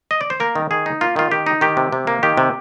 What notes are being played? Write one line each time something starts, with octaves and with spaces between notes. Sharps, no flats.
D#5
D5
C5
A#3 A#4
D#3
D#3 G#4
D#4
A#3 F4
D#3 F4
D#3 G4
D#4
D#3 G4
C3
C3
A#3
D#3 G4
C3